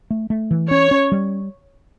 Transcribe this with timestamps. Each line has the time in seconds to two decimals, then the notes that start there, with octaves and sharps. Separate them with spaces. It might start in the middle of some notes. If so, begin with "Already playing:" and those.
0.11 A3
0.30 A3
0.51 E3
0.71 C#4 C#5
0.91 C#4
1.12 G3